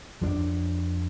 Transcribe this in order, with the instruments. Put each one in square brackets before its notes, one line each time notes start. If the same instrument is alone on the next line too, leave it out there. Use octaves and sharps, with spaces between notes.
[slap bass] F2 F3 D4